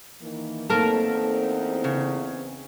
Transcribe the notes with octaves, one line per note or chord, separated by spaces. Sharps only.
D#3 E3 A#3
E2 A3 A#3 C4 D#4 A#4 A5
C#3